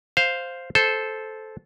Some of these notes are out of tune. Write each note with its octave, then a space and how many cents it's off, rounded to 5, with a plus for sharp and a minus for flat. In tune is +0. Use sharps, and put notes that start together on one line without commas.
C5 +0 F5 +0
A4 -15 C5 +0